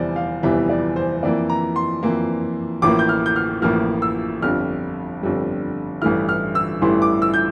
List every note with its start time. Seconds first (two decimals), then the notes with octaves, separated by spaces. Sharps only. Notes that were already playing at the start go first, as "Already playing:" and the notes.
Already playing: F1 E2 E3 G3 C5 D5
0.16 F5
0.43 F1 E2 E3 G3 E5
0.69 D5
0.96 C5
1.23 F2 E3 A#3 D5
1.50 A#5
1.76 C6
2.03 F2 E3 A#3
2.82 A1 A2 F3 A#3 D6
2.99 G6
3.09 F6
3.26 G6
3.36 F6
3.62 A1 A2 F3 A#3 F6
4.02 E6
4.42 G1 F2 D3 G3 F6
5.22 G1 F2 D3 G3
6.02 A1 G2 E3 A3 E4 F6
6.29 F6
6.55 E6
6.81 A1 G2 E3 A3 E4 C6
7.02 D6
7.22 E6
7.34 G6